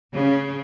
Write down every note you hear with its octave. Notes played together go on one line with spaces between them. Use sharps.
C#3